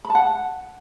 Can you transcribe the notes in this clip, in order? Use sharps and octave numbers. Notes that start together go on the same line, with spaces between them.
B5
A5
F#5